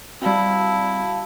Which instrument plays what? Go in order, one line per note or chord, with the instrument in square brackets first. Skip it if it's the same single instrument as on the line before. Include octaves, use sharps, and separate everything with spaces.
[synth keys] G3 C4 [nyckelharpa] E4 [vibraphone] F#4 F5 A5